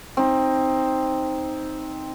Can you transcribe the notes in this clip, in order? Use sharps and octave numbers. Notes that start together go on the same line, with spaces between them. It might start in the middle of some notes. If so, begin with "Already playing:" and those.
C4 D#4